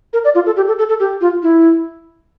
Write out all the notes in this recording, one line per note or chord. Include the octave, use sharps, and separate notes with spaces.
A#4
D5
F4
A4
G4
A4
A4
A4
G4
F4
E4